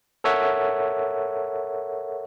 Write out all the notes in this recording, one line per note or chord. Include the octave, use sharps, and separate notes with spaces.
A4 A#4 C#5 E5 F#5